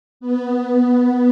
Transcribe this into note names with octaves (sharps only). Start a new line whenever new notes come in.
B3